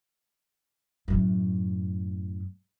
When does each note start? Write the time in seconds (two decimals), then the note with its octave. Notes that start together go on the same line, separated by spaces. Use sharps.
1.08 F#2 A2